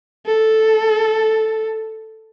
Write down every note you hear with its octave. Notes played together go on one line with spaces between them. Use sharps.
A4